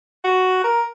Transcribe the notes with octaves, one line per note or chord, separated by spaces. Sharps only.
F#4
A#4